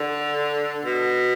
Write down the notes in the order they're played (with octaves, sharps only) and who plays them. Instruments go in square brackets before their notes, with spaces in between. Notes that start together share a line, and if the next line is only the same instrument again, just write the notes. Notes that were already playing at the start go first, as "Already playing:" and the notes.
Already playing: [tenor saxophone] D3
B2